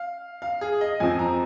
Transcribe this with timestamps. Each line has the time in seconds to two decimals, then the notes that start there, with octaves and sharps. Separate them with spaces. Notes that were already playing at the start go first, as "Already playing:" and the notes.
Already playing: F5
0.42 F5
0.61 G#4
0.81 D#5
1.00 F2 F3 C4 G#5
1.19 A#5